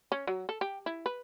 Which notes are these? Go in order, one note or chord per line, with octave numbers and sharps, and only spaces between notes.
C#4
F#3
A4
G4
E4
B4